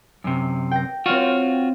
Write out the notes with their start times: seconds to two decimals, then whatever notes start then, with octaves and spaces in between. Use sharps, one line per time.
0.24 F#2 C3
0.71 G5 A#6
1.06 C4 F4 F#4 C#5 F5